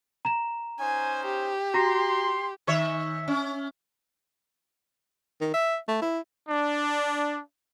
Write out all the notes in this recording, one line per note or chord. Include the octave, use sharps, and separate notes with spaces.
A#5 E7
C#4 D#4 C5 G#5
G4
F#4 A#5 C6 A#6
D#3 C#5 E5
C#4
D#3
E5
A3
E4
D4